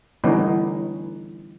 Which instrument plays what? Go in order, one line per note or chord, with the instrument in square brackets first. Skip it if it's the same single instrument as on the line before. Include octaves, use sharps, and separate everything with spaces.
[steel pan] D3 E3 G3 B3 C#4 D#4